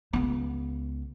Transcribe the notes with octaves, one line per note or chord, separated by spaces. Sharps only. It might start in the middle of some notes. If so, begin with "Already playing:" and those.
C#2 B3